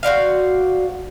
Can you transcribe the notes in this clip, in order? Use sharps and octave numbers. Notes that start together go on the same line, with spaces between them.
F#4 C5 D5 F5